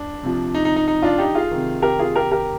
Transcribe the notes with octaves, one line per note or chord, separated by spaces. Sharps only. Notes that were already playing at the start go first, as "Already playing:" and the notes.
Already playing: D4
C3 F3
D#4
D#4
D#4
D#4
D4 F4
D#4 G4
F4 G#4
C3 D#3
G4 A#4
F4 G#4
G4 A#4
G4 A#4